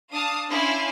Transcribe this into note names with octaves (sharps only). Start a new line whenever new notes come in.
D4 F5 A5 D#6
C#4 D4 E4 F5 G#5 C6